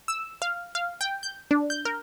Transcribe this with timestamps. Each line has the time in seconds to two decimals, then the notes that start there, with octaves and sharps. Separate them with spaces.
0.08 E6
0.42 F5
0.75 F5
1.01 G5
1.23 G6
1.51 D4
1.70 G6
1.85 A#4